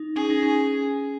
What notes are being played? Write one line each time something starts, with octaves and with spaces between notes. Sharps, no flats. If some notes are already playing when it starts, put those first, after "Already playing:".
Already playing: D#4
C#4 G#4
D#4
C#4